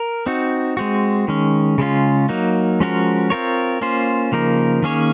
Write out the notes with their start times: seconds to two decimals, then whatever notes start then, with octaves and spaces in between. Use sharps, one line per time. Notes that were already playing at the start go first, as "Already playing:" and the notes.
Already playing: A#4
0.26 C4 D#4 F#4
0.77 G#3 C4 F#4
1.28 D#3 G#3 C#4
1.78 C#3 G#3 C#4 F4
2.29 F#3 A#3 D#4
2.80 F3 G#3 C#4 F#4 A#4
3.30 C4 F4 A#4 C#5
3.81 A#3 C#4 F4 C5
4.32 C#3 F3 A#3 D#4 A#4
4.82 D#3 A#3 C#4 G#4 C#5